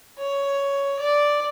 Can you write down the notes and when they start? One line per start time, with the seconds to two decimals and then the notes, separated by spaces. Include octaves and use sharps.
0.18 C#5
0.99 D5